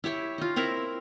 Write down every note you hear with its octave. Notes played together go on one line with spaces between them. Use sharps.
E4 G4 C#5 E5
D#4 F4
C4 E4 A#4